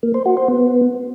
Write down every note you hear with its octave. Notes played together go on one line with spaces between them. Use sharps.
A#3
C5
F#4
C5
B3